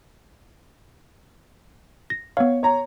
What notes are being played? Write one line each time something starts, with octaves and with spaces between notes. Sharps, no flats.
A#6
B3 C#5 F5
C#5 A#5